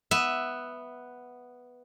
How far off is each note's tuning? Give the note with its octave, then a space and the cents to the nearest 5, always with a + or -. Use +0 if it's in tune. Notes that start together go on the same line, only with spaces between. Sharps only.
B3 +0 E5 +0